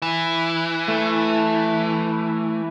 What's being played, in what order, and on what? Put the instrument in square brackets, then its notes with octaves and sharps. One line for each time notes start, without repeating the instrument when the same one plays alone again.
[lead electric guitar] E3
[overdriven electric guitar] A3